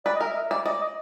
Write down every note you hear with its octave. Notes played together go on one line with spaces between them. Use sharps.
B4 D5
D#5
A#4
E5
D#5
D5 E5
D5 D#5
D#5